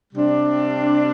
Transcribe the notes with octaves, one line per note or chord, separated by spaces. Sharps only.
C3 G3 D4